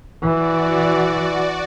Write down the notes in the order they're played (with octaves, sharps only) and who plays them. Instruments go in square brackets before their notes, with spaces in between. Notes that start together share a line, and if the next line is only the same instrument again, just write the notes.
[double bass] E3 [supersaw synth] F#4 D5